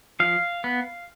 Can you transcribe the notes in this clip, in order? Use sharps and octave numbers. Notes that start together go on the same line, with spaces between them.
F3 F5
B3